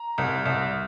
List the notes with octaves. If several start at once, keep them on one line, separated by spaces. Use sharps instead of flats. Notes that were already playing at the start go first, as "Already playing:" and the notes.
Already playing: A#5
C2
C2